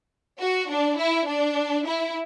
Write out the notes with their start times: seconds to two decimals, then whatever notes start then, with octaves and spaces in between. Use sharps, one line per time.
0.40 F#4
0.69 D4
0.98 E4
1.27 D4
1.86 E4